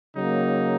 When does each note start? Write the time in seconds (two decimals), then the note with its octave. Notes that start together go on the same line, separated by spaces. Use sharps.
0.17 C#3 F#3 A#3 D#4